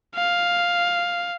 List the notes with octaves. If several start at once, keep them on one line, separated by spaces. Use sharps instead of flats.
F5